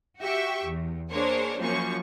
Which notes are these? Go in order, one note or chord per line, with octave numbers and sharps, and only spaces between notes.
F#4 G4 E5 G5 C#6
E2
A#3 D4 G#4 A#4 C5 C#5
F#2 F3 A#3 C#4 C#6